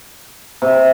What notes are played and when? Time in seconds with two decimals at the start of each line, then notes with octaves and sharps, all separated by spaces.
0.62 C3